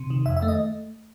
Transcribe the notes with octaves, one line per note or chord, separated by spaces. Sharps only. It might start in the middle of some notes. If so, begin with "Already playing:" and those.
Already playing: C3
D#3
F2 E5
E5
A3
D#5